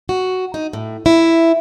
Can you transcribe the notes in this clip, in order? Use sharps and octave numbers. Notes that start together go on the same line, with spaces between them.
F#4
D#4
A2
E4